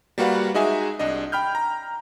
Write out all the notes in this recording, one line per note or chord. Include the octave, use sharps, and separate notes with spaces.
G3 A#3 F#4 B4 F5 F#5
G#3 D#4 F#4 G#4 E5 G#5
C2 D4 D#5
G5 B5 F6 G6
A#5